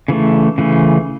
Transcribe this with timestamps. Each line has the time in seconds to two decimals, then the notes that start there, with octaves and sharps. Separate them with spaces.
0.08 C#3 E3 A3
0.58 C#3 E3 A3